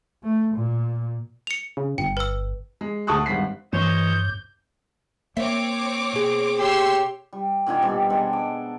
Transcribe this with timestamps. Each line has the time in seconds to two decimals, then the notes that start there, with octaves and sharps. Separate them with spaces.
0.23 A3
0.55 A#2
1.47 C#7 F7
1.77 C#3
1.98 G1 G5
2.17 B4 E6
2.81 G#3
3.07 D2 A5 C#6 D#6 F#6
3.26 G#1 G2 F#5 B6 C7
3.73 G2 E3 C5 C#5 D#5 G6
5.37 A#3 C4 C#5 E5 D6
6.13 B2 G#4
6.59 G4 C#5 C6 E6
7.33 G3
7.66 A#2 D3 D#3 G#5
7.82 B2 G3 C4
8.10 B2 G#3 D4 A4
8.33 D6